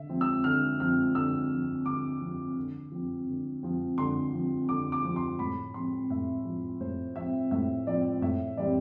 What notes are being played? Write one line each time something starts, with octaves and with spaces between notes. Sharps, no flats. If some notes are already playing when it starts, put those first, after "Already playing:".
Already playing: D3 E5
F3 C4
E6
D3 F6
F3 C4 F6
D3 E6
F3 C4
D3 D6
F3 C4
D3
F3 C4
D3
F3 C4
D3 C6
F3 C4
D3 D6
D6
F3 C4
C6
A2 B5
F3 C4 C6
A2 E5
F3 C4
A2 C5
F3 C4 E5
A2 E5
F3 C4 D5
A2 E5
E3 G3 C4 D5